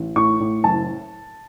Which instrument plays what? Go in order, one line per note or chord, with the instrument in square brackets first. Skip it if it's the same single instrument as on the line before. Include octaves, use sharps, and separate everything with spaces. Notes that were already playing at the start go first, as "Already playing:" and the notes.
Already playing: [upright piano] A1
A2 C#6
A2
F#1 A5